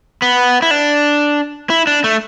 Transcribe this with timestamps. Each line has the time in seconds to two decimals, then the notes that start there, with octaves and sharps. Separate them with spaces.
0.22 B3
0.62 E4
0.71 D4
1.70 E4
1.87 D4
2.04 A3